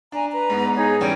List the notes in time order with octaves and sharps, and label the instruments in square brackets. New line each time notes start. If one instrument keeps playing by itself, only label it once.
[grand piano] D4 [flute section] G#5 A#5
[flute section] B4 A#5
[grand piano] G#2 B3
[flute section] D#4 G#4 C#5
[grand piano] E3 G3 C#4 [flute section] G5